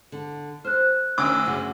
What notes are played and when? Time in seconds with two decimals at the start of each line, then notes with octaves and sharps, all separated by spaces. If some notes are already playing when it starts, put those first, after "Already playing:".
0.12 D3
0.65 C5 F6 F#6
1.18 D2 D#3 C#4 D4 D6 E6
1.46 F#2 C#3 F#4